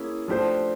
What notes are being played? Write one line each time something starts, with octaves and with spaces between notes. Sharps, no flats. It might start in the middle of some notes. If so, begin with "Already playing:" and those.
Already playing: A#3 C#4 E4 G#4
F3 A3 D4 G4 C5